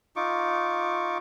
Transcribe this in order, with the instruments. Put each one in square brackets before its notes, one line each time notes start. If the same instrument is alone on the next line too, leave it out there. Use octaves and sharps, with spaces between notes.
[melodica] D#4 F4 C#6 D6